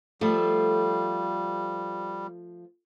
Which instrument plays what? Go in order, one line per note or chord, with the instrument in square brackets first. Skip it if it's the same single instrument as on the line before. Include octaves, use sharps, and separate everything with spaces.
[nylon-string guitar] F3 A3 [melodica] G3 [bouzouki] A4